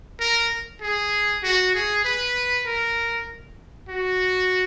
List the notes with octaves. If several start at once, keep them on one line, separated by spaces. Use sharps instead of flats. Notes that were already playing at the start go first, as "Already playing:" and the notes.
A#4
G#4
F#4
G#4
B4
A#4
F#4